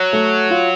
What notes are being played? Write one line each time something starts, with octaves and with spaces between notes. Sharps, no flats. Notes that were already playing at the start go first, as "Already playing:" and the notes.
Already playing: F#3
A3
F4